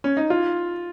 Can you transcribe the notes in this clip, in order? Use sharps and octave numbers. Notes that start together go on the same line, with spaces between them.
C#4
D#4
F4